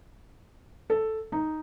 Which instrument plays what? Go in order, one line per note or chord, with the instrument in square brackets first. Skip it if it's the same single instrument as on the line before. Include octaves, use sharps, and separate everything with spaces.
[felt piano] A4
D#4